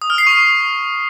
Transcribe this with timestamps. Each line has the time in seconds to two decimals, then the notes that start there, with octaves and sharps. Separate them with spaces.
0.02 D#6
0.10 F6
0.18 C7
0.27 C#6